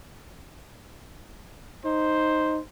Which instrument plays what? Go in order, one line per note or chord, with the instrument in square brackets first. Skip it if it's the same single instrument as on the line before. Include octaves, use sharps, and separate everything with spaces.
[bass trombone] D#4 [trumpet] C5